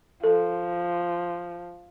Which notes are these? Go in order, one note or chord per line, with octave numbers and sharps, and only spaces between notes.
F3 A4